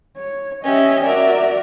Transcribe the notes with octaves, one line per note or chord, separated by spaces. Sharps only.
C#5
C#4 G4 D#5 E5
F#4 A#4 D5 E5